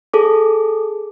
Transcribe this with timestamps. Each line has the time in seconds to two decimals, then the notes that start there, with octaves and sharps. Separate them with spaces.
0.13 G#4 A4 D6